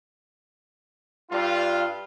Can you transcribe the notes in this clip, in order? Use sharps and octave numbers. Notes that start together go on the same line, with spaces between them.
G2 G3 F4